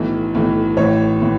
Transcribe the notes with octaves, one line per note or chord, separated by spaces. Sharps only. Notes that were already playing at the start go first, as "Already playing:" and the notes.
Already playing: B1 A2 E3
B1 A2 E3
A1 A2 E3 C#5
A2 E3